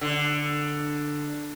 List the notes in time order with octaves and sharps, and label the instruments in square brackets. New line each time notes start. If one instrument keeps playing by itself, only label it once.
[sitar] D3